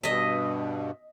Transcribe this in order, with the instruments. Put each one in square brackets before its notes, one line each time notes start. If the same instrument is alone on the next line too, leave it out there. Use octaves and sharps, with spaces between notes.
[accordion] G2 B2 [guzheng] D#5 E5